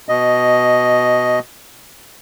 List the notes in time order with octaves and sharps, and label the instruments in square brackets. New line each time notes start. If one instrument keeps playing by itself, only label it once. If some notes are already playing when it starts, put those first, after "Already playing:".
[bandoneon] B2 D#5